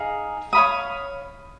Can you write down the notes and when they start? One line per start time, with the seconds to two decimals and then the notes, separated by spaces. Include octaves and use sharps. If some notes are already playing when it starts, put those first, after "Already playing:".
Already playing: D#4 G#4 F5
0.53 C#5 F5 B5 D#6